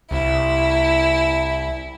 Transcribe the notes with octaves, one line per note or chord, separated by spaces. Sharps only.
C2 E4